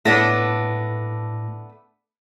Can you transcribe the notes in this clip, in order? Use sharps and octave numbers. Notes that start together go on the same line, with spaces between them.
A2 A3 B3 D4 A#6